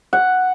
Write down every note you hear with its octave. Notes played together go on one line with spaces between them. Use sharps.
F#5